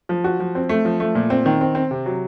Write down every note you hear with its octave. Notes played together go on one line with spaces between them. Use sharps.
F3
F#4
F3
C4
A3
F3
A3
A#2
C4
D#3
C4
C4
C3
F#3